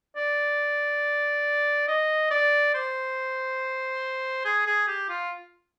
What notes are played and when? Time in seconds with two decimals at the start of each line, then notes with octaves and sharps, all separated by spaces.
0.17 D5
1.88 D#5
2.31 D5
2.74 C5
4.45 G#4
4.67 G#4
4.88 G4
5.09 F4